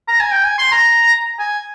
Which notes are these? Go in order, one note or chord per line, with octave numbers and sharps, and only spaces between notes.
A#5
G#5
G5
G#5
C6
A#5
G#5